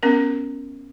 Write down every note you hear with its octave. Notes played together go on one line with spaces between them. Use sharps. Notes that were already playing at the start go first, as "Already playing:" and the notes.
B3 C#4 A#4